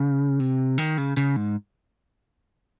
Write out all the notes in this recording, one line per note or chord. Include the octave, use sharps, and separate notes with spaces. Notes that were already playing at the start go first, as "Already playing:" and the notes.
Already playing: C#3
C3
D#3
C#3
C#3
G#2